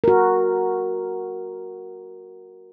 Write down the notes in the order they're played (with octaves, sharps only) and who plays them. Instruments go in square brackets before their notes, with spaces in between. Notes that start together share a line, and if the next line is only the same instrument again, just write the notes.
[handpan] F#4 A#4